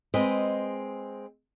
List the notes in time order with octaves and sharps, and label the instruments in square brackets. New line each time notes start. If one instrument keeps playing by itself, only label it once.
[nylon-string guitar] G#3 C4 B4 D#5